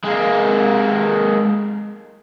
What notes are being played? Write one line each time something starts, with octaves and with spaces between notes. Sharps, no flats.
G#3 A#3